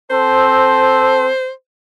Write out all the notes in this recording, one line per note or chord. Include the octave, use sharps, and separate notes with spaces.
C4 A4 C5